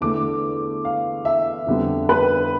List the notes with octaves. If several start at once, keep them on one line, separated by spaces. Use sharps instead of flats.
E2 D3 A3 D6
F5
E5
F2 D3 G3 B3
B4